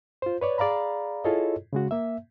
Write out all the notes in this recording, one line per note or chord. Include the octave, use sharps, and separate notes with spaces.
F4 C5
B4 C#5 D5
G#4 D5 F5 A#5 B5
E4 F4 G#4 A4 C#5 D#5
C#3 G#3 F#4
A#3 E5